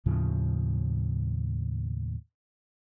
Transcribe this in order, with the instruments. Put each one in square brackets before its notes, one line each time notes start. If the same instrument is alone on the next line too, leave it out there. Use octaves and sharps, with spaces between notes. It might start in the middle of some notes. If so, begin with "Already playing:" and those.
[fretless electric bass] D#2 A2 C#3 F3